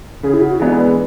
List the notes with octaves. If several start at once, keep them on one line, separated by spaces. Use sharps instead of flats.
C#3 G#4
E4
F#4
E3 G#3 B3 D4 G#4
B4